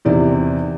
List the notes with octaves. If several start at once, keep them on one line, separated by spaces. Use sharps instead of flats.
E2 C3 D#3 D5